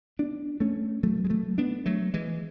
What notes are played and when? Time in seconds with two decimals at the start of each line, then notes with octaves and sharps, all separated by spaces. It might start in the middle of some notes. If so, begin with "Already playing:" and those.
0.19 B3 D4
0.60 A3 C#4
1.03 F#3 A3
1.25 G#3
1.30 F#3 A3
1.58 B3 D4
1.86 F#3 A3
2.14 E3 G#3